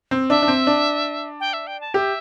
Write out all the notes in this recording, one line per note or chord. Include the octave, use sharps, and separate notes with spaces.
C4
D4 E5
D4
C4
D4
G5
E5
G5
A5
G4 E5